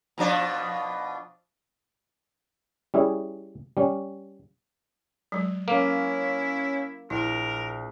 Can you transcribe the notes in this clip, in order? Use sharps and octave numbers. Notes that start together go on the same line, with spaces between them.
B2 F3 D4
G3 C#4 E4 G#4
G3 C#4
F#3 G#3
A#3 C#4 E4 F5
A#1 E4 A#4